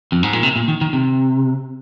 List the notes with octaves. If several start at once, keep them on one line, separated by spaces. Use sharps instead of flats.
F2
G#2
A#2
C3
A#2
D#3
D#3
C3